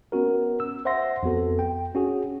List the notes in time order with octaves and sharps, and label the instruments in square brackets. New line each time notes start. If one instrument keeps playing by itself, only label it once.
[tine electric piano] B3 C#4 F#4 A#4
E6
C5 E5 F#5 C6 A#6
F2 B3 F#4 A4
G5
C#4 F#4 G#4